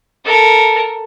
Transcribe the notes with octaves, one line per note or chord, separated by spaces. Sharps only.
A4 A#4